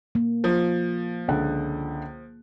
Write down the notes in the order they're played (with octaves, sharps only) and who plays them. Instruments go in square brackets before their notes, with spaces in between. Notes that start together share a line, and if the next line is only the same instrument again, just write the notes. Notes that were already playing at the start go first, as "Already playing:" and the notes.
[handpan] A#3
[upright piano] F3
[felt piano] C#2 D3 F#5